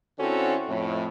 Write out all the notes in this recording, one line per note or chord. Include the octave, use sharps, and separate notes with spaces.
D3 C4 C#4 E4 F#4 A4
F2 A2